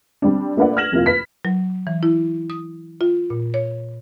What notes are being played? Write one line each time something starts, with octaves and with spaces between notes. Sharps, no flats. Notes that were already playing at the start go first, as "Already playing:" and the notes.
G3 C4 D4
A3 A#3 D4 B4 D5 F#5
F6 G#6 A#6 E7 F#7
F1 F2 A#3 E4 F4
B4 B6
F#3
E3
E4
D#6
F4
A#2
C#5